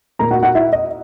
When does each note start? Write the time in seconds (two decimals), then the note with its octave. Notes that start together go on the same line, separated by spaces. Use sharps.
0.19 A#2 A#3 A#4 A#5
0.31 F#4 F#5
0.43 F#4 F#5
0.54 E4 E5
0.73 D#5